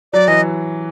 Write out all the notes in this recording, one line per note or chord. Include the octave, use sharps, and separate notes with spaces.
F#3 D5
E3 D#5